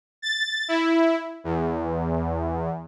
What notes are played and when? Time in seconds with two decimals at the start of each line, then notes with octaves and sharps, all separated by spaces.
0.22 A6
0.68 E4
1.44 E2